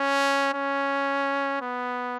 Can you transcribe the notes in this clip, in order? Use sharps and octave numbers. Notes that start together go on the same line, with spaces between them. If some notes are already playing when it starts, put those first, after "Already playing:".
Already playing: C#4
C#4
B3